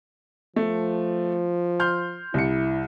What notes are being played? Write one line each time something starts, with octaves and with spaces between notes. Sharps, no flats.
F3 A3
C6 F6 G6
C2 E4 C#7